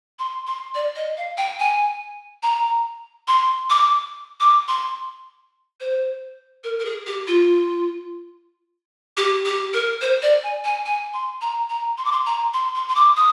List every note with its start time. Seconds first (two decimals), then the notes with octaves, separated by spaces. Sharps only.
0.19 C6
0.47 C6
0.74 D5
0.95 D#5
1.17 F5
1.37 G5
1.59 G#5
2.43 A#5
3.27 C6
3.70 D6
4.40 D6
4.68 C6
5.80 C5
6.64 A#4
6.79 A#4
6.85 G#4
7.06 G4
7.27 F4
9.17 G4
9.45 G4
9.73 A#4
10.01 C5
10.22 D5
10.43 G#5
10.64 G#5
10.85 G#5
11.13 C6
11.41 A#5
11.69 A#5
11.98 C6
12.05 D6
12.12 C6
12.26 A#5
12.53 C6
12.75 C6
12.88 C6
12.95 D6
13.16 D#6